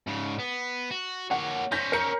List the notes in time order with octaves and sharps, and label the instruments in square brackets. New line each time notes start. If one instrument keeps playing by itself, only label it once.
[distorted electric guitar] G#2 C#3
B3
F#4
[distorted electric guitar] A#3 C#5 [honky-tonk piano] F#5
[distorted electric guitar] C#4 C5 [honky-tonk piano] G6 A#6 B6
[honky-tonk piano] A#4 C#7